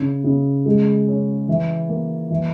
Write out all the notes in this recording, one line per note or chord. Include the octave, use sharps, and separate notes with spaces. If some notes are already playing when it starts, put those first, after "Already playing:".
Already playing: C#3
C#3
G#3
C#4
E3
A#3
E3